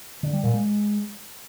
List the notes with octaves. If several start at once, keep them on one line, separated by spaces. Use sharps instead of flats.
D3
G3
A#2
G#3